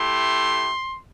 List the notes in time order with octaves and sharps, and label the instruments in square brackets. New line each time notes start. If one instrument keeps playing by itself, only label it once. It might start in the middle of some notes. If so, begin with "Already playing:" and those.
Already playing: [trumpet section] A3 E4 G4 C6